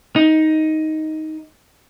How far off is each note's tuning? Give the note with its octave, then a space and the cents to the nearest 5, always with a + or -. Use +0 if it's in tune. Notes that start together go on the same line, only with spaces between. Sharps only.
D#4 +10